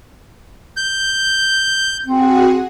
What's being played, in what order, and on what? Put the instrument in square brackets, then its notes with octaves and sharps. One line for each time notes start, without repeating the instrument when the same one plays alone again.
[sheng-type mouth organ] G6
[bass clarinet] C4 [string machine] F#4 G#4 F#5